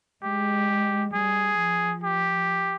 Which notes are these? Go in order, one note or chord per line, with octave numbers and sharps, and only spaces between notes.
G#3 G4
G3 G#4
F3
G4